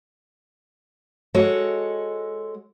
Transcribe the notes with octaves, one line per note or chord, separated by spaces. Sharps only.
G#3 F#4 A4 C#5